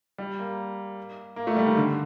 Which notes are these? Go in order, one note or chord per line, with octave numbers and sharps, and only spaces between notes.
G3
A#3
A#3
A3
G3
D#3
D3